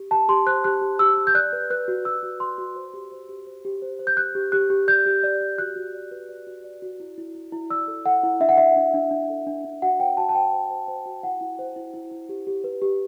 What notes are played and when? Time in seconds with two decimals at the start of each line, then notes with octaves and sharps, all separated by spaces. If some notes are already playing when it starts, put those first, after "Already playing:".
Already playing: G4
0.11 G4 A5
0.29 G4 C6
0.46 C5 F#6
0.64 G4 F#6
0.81 G4
0.99 G4 E6
1.17 G4
1.27 G6
1.34 D5 F#6
1.53 B4
1.70 B4 F#6
1.88 F#4
2.05 F#4 E6
2.23 F#4
2.40 F#4 C6
2.58 F#4
2.76 C5
2.94 G4
3.12 C5
3.29 G4
3.47 C5
3.65 G4
3.82 C5
3.99 C5
4.07 G6
4.17 G4 F#6
4.35 G4
4.52 G4 F#6
4.70 G4
4.87 D5 G6
5.06 G4
5.24 D5
5.41 G4
5.58 F#4 F#6
5.76 F#4
5.94 D5
6.11 B4
6.29 D5
6.47 F#4
6.64 D5
6.82 F#4
7.00 E4
7.18 E4
7.35 E4
7.52 E4
7.70 D5 E6
7.88 A4
8.06 A4 F#5
8.23 E4
8.40 D4 E5
8.49 F#5
8.57 D4 E5
8.76 D4
8.94 D4
9.11 D4
9.30 A4
9.47 D4
9.64 D4
9.82 F#4 F#5
10.00 C5 G5
10.17 F#4 A5
10.29 A5
10.35 C5 G5
10.53 C5
10.70 C5
10.88 C5
11.06 F#4
11.23 E4 F#5
11.41 E4
11.59 C5
11.76 E4
11.94 E4
12.11 E4
12.29 G4
12.47 G4
12.64 B4
12.82 G4